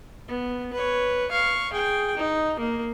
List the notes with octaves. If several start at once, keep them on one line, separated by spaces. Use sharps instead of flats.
B3
B4 C#5
F5 C#6
G#4 G5
D#4
A#3